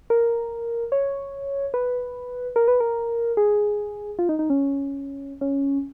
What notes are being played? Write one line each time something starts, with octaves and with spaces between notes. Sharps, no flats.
A#4
C#5
B4
A#4
B4
A#4
G#4
F4
D#4
D#4
C#4
C#4